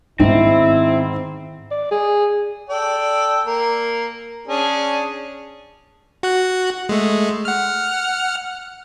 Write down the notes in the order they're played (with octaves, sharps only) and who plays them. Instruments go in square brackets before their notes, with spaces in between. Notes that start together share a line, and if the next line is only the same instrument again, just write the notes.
[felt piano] G#2 [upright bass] D#3 B3 [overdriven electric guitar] C4 [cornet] E4
[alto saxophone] D5
G#4
[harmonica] A4 D5 G5
A#3
C#4 D4 G#4
[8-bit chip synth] F#4 F#6
G#3 A3
F#5 F6